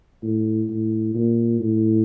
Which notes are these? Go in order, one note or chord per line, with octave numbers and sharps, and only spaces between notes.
A2
A2
A#2
A2